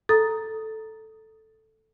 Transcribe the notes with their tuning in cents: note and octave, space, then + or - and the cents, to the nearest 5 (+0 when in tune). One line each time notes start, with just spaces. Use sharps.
A4 +0 A#5 +0 D#6 +0